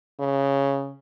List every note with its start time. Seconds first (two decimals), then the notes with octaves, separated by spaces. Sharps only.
0.20 C#3